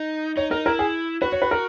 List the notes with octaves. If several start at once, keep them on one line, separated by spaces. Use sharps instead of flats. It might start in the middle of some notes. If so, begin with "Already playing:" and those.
Already playing: D#4
D#4 C#5
D#4 A#4
E4 A#4
G#4
F#4 B4
C#5
B4
A#4